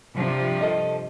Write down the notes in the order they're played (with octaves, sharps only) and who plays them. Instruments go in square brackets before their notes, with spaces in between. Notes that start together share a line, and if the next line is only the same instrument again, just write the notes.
[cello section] G2 C3 F3
[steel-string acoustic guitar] A4 D#5